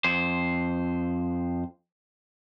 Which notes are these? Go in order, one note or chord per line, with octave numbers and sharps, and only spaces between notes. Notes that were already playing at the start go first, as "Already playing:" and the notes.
F2 C5